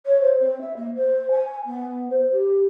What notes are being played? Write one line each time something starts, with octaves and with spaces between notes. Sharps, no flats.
C#5
C5
C4
E5
A#3
C5
G#5
B3
C5
G4